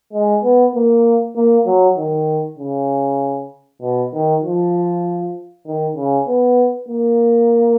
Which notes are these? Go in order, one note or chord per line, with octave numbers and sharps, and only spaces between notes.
G#3
B3
A#3
A#3
F#3
D#3
C#3
B2
D#3
F3
D#3
C#3
B3
A#3